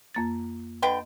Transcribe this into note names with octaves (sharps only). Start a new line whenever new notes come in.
F2 A#3 A6
D3 B4 D#5 G5